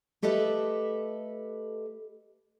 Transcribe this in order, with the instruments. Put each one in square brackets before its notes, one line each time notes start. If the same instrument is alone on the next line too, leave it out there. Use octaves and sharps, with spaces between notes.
[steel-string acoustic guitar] A3 G4 A4 B4 D#5 E5